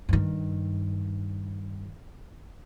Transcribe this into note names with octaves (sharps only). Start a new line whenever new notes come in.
G2 D#3